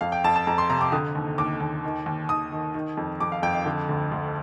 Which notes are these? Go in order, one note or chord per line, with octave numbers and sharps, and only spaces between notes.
F2 F5
G5
F2 A5
A5
F2 A#5
C6
C3 A#5
D6
D3 D#6
D#2
D#2 D6
D#2
D#3
D#2
D#2 D#6
D#3
D#3
F2
F2 D6
F5
F2 G5
F5
D3
D2
D2